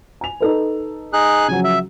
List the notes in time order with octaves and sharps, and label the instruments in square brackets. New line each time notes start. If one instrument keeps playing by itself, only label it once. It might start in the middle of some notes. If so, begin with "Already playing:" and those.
[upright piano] G#5 F7
D#4 A4 B4
[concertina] D#4 G#4 F#6
[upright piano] C#3 F3 F#3 [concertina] G#5
[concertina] E5